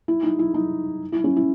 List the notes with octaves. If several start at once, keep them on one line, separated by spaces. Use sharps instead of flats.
E4
D#4
E4
D#4
E4
C#4
E4